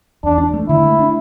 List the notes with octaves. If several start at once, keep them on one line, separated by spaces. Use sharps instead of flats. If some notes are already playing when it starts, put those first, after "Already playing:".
E2 D4
D4
A3
D3 E4
A3
D4